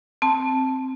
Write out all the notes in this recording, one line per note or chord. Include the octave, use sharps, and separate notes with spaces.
C4 A5